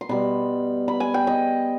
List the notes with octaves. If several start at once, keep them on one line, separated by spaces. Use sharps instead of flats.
C6
B2 G3 B5
B5
G#5
G5
D#5